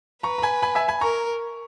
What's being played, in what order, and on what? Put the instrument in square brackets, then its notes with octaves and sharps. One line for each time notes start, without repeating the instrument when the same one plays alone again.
[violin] B4 [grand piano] A#5 C#6
[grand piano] A#5
G#5 B5
G#5 B5
E5 G#5
G#5 B5
[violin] A#4 [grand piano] A#5 C#6